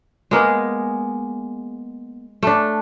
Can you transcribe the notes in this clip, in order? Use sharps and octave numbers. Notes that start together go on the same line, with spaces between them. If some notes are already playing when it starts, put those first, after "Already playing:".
G#3 A#3 B3 G#4
A3 D4